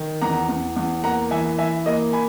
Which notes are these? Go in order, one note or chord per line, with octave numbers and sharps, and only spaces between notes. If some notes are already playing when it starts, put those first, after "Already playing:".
Already playing: D#3
E2 F#5 A#5
E2
E2
A#3 F#5 A#5
E3 E5 G#5
E3 E5 G#5
A#3 D#5
G#5 B5